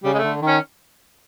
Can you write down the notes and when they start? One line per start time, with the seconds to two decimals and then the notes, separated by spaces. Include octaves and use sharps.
0.04 C#3 G3
0.14 G#3
0.19 D3 A3
0.42 D#3
0.47 C#4